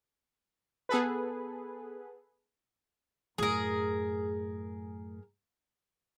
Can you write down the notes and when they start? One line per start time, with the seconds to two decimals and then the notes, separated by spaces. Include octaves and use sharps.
0.89 B3 G#4 A4 B4
3.38 F#2 A2 G#4 A#4